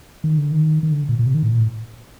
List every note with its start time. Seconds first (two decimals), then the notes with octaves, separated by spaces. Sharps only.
0.24 D#3
0.38 D3
0.52 D#3
0.83 D#3
0.92 D3
1.09 A#2
1.19 A#2
1.26 C3
1.34 D#3
1.43 A2
1.51 A#2
1.60 A2